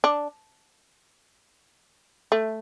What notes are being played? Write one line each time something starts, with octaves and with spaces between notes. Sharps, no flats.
D4
A3